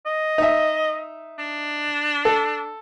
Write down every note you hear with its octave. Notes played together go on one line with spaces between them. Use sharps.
D#5
D#4 E5
D4
A4